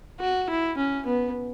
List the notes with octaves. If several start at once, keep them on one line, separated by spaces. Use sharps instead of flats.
F#4
E4
C#4
B3